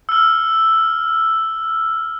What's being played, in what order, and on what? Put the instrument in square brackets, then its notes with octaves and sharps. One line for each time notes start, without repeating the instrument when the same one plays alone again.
[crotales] E6 F6